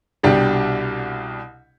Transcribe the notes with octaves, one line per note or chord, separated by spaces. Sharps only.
C2 B2 G3 D4 G4